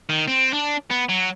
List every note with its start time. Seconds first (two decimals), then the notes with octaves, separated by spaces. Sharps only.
0.09 D#3
0.28 C4
0.53 D4
0.90 B3
1.09 F#3